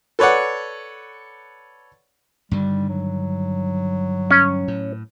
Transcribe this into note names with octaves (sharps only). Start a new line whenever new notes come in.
A4 B4 C#5 D5 F#5
G2 D3 D#3 G3
F#3
C#4
A2